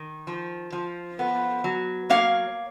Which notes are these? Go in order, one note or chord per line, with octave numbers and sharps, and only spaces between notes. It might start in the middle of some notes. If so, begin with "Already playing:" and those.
Already playing: D#3
F3
F3
B3
F#3
A#3 C#5 F5